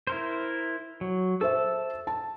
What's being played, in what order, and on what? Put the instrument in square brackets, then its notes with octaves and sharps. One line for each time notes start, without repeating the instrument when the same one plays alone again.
[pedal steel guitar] E4 A#4 C5
F#3
[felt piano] A4 C5 E5 [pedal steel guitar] A5 E6
[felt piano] A5